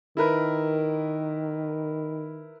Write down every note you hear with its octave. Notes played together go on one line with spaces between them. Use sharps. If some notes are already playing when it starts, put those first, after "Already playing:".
D#3 E4 A#4 B4